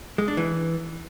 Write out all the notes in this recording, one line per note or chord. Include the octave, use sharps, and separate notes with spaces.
G#3
D4
E3